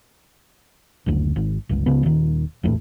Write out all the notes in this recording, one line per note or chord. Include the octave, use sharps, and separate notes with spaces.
F#1 D2
G#1
G1 C#2
C#2 C#3 B3
D#1 D#3
F1 A#1 E2 A2